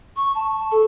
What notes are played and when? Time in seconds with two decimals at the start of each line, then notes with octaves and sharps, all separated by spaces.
0.16 C#6
0.35 A5
0.72 A4